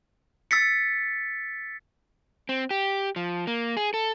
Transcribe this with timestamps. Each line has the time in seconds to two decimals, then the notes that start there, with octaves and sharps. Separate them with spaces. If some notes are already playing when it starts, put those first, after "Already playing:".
0.51 E6 A6 B6 C#7
2.49 C4
2.71 G4
3.16 F3
3.47 A#3
3.77 G#4
3.94 A4